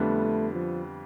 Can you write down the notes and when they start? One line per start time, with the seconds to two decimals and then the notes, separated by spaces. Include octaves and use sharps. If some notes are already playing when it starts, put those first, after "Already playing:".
Already playing: F2 D3 G3 A3 B3 D4
0.54 F3